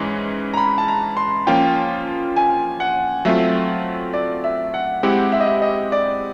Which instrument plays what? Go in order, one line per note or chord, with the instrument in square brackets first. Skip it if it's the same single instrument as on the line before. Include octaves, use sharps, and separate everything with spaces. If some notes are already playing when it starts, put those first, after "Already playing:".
Already playing: [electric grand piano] G#2 E3 G#3 C#4
[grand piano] A#5
B5
A5
A#5
C6
[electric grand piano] F3 A#3 C#4 F4 [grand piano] G5
[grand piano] G#5
F#5
[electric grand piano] F#3 A3 C4 F4 [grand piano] E5
[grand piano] D5
E5
F#5
[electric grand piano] G#3 C4 E4 G4 [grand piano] F#5
[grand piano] E5
D#5
E5
D#5
D5